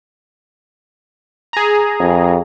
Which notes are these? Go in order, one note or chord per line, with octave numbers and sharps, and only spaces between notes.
G#4 A#5
F2